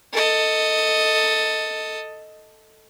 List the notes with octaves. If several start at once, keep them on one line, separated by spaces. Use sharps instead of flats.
A4 D#5